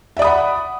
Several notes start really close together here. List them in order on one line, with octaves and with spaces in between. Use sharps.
E5 D5 D#6 B5 F#5